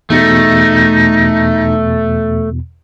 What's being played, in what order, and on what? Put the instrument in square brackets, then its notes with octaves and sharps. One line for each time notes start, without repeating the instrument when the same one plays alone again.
[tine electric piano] E2 B2 [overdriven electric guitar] A3 [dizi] D#4